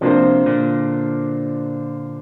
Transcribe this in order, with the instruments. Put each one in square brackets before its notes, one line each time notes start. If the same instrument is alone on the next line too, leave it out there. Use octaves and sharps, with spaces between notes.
[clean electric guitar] C3 F3 [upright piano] A#3 D4 F4 C5
[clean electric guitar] A#2 D3